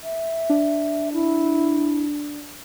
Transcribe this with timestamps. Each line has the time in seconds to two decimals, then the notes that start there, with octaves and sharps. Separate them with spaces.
0.03 E5
0.50 D4
1.13 E4